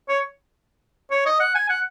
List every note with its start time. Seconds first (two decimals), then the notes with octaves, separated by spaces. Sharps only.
0.09 C#5
1.11 C#5
1.26 D#5
1.40 F#5
1.55 G#5
1.70 F#5